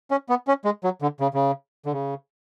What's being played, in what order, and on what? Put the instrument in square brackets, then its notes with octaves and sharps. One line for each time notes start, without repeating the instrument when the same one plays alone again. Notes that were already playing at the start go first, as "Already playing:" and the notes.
[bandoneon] C#4
B3
C#4
G#3
F#3
D3
C#3
C#3
D3
C#3